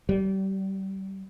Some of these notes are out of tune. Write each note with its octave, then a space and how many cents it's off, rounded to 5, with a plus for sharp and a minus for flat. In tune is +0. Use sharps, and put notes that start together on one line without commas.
G3 -30